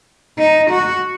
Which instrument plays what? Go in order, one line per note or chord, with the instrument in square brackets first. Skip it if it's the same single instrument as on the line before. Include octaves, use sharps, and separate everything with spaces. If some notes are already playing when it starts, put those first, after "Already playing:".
[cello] D#4
F#4